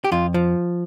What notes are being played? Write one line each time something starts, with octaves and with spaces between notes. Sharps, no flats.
G4
F2 F4
F3